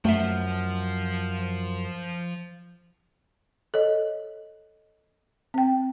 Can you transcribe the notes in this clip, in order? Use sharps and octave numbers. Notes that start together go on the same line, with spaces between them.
F#2 F3 A3 E5
A4 C#5 D#5
C4 G5